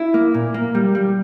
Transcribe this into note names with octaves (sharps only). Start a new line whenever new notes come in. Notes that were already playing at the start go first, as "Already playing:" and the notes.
Already playing: E4
A#3
A#2
A#3
G3
G3